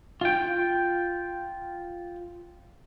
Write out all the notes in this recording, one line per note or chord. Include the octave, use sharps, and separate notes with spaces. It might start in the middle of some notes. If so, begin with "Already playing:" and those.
F4 G5